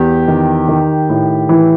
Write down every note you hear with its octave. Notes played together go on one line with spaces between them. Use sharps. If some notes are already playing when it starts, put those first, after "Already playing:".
Already playing: E2 G4
D#3
D#3
A2
E3